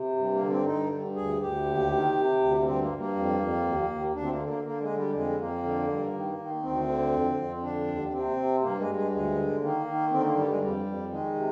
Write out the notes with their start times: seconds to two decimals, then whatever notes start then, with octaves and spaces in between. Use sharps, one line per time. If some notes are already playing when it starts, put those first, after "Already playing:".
Already playing: C3
0.16 G2
0.33 A#3
0.41 D3
0.50 C4
0.66 G2 D#4
0.91 G2
1.15 D2 G#4
1.41 D2 G4
1.65 D#2
1.90 D#3
2.15 C3
2.40 D2
2.60 A#3
2.65 G2 C4
2.81 A#3
2.90 G2
2.98 A#3
3.15 F2
3.40 F2
3.64 D#2
3.89 D#2
4.14 D2 D4
4.22 C4
4.31 A#3
4.39 D3
4.47 A#3
4.64 D3 A#3
4.80 G#3
4.89 D3
4.96 G3
5.13 F2 G#3
5.38 F2 A#3
5.63 D3
5.88 G2
6.13 D#3
6.38 D#3
6.63 D2 C4
6.87 D3
7.12 F2
7.37 F2
7.62 D3 D4
7.87 D#2
8.08 D4
8.12 C3 C4
8.36 C3
8.62 G2 A#3
8.78 G#3
8.87 G2
8.95 G#3
9.11 D2 G#3
9.36 D3
9.61 D#3 A#3
9.86 D#3
10.11 D3 C4
10.23 A#3
10.36 G2 G3
10.48 G#3
10.60 F2 G3
10.85 F2
11.10 D#3 G#3
11.35 C3